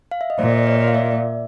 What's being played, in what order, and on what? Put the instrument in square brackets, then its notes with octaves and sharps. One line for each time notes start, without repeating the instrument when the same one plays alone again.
[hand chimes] F5
E5
D#5
[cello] A#2 [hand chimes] C5 D5
[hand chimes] E5
C#5 D#5
F5
D5 E5